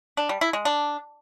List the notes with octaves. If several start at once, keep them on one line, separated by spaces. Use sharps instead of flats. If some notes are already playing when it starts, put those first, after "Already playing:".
D4
G3
E4
G#3
D4